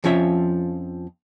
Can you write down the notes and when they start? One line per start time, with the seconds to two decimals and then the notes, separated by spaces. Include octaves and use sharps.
0.04 F2 F3 C#4 F4 E5